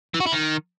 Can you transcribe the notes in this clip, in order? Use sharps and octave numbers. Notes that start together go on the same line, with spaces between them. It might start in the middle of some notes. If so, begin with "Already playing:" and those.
E3
F#4
E4
D#3